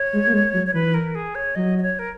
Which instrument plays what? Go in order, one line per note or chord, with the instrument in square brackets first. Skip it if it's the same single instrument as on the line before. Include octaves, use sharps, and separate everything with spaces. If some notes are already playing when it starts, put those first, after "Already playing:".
Already playing: [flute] C#5
[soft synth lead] G#3
A#3
G#3
F#3
[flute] C#5
[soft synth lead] E3 [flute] B4
[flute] A#4
G#4
C#5
[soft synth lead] F#3 [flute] D#5
[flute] D#5
C#5
A#4